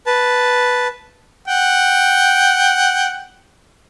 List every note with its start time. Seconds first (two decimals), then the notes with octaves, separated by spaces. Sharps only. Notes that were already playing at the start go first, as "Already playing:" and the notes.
0.06 B4 A5
1.48 F#5 G5